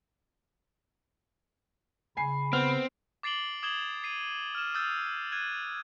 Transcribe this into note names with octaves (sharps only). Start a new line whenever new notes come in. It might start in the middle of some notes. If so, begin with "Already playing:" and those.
C#3 G#5 B5 C7
B3 C4 F6 F7
D6 A6 C7 D7 F#7 G7
D6 D#6 G#6 E7 F#7 G7
C7 D#7
F6 E7
D#6 E6 G6 A6
F#6 G#6 D#7